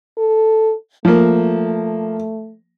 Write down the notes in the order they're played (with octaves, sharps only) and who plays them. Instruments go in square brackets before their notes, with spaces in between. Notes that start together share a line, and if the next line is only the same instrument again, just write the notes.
[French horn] A4
[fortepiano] F3 A#3 [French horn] A3